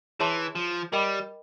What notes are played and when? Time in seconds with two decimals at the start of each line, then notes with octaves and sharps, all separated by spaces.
0.20 E3 G#4 C#5 E5 A5 C6
0.55 F3
0.92 G3 A#4 D#5 G5 B5 D6